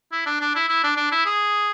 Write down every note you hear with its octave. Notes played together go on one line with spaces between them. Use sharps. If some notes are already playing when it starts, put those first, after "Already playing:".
E4
D4
D4
E4
E4
D4
D4
E4
G#4